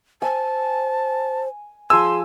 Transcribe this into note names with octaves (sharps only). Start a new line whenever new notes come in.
C5 G#5 A5
F3 G#4 G#5 C6 E6